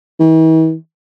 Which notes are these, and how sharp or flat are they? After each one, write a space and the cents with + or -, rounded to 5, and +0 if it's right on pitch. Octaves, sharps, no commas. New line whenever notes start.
E3 -45